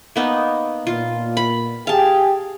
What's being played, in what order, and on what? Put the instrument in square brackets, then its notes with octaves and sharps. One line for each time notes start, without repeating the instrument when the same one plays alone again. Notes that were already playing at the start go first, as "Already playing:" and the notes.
[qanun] A#3 B3 D#4
[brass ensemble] A#2 [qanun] F4
[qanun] B5
[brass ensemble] G4 G#4 G5 [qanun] F5 A5